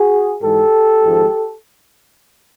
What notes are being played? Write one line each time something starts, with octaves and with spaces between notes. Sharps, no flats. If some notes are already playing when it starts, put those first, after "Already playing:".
Already playing: F#4 G#4
G#2 E3 G#3 G4 A4
G#1 G#2 F3 G#3